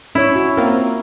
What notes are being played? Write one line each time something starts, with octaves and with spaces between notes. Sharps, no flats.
C#4 E4 C#5
F#4
A#3 C4 F4 A#4